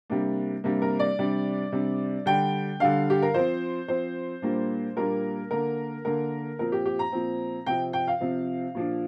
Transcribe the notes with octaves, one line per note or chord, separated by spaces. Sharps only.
C3 G3 A#3 D4
C3 G3 A#3 D4
A#4
D5
C3 G3 D4
C3 G3 D4
D3 G3 D4 G5
D3 G3 D4 F5
G4
A#4
F3 C4 C5
F3 C4 C5
A#2 G3 A#3 D4
A#2 G3 A#3 D4 A#4
D3 A#3 D4 A#4
D3 A#3 D4 A#4
A#2 F3 C4 A#4
G4
G4
A#5
A#2 F3 C4
C3 F3 C4 G5
G5
F5
C3 F3 C4
A#2 F3 D4